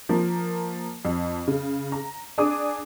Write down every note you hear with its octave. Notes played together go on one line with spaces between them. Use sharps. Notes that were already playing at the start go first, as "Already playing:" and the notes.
F3 A#3
F2
C#3
A#5
D4 G#4 D6 D#6